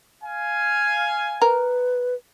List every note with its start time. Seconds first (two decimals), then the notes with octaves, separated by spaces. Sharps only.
0.24 F5 G#5
1.42 A#4 B4